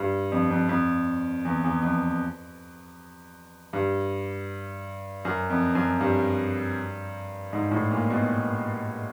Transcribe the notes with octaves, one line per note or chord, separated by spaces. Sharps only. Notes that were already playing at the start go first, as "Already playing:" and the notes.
Already playing: G2
F2
F2
F2
E2
E2
F2
G2
F#2
F2
F#2
G2
G#2
A2
A#2
B2